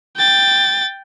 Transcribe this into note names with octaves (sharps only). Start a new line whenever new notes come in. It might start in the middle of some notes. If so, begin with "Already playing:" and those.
G5 A6